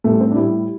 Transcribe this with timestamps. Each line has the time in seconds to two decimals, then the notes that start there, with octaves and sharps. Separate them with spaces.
0.04 A2 G3 A3
0.20 C4
0.32 D4
0.36 A2 G3 E4